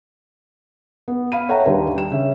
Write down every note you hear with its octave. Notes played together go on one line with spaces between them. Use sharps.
B3
F5 B5 D#7
A4 C#5 E5 F#5 G5 A#5
D#2 G3 D4 B4
D4 G5 E7
C#3 C#4 E5